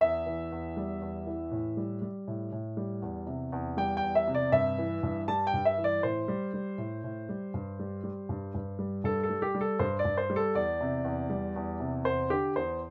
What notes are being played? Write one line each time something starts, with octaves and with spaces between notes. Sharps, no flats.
E2 E5
E3
E2
G3
E2
E3
A2
G3
G3
A2
A2
G3
E2
C3
E2
G3 G5
G5
E2
E5
C3
D5
G2 E5
E3
G2
G3 A5
G5
G2
E5
E3
D5
A2 C5
G3
G3
A2
A2
G3
G2
G3
G3
G2
G2
G3
G2 A4
A4
G3
G4
G3
A4
G2 C5
D5
G2
C5
G3
A4
E2 D5
C3
E2
G3
E2
C3
E2 C5
D3 G4
E2 C5